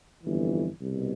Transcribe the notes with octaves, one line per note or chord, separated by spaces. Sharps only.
G1 F2 E3
C2 B2